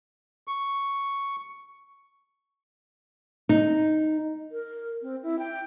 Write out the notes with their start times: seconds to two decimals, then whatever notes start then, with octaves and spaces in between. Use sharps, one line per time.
0.48 C#6
3.49 D#4
4.52 A#4
5.02 C4
5.23 E4
5.39 G5